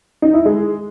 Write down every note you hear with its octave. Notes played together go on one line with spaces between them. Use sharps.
D#4
E4
G#3